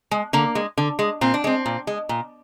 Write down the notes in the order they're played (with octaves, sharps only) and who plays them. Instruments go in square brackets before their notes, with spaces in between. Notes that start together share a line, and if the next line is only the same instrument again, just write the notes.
[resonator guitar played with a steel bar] G#3
D3 A#3
G#3
D3
G#3
A#2 C4
D4
G#3 C4
A#2
G#3
A#2